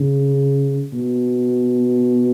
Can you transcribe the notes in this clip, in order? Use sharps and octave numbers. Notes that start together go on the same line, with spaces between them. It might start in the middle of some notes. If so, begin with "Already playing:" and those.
Already playing: C#3
B2